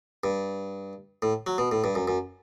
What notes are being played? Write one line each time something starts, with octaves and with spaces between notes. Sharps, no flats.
G2
A2
F#3
B2
A2
G2
F#2
F#2